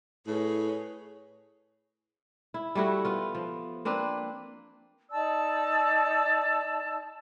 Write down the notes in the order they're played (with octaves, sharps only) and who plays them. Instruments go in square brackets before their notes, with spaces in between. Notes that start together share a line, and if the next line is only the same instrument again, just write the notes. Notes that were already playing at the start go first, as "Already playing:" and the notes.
[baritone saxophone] A2 [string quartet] G#4 B4 C#5
[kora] E4
G3 A3 E4 F#4
B3 F4
F3
A#3 C4 D4 B4
[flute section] D#4 D5 A5 E6